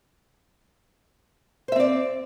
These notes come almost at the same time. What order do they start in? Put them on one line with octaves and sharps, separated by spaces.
C5 E5 C4 D5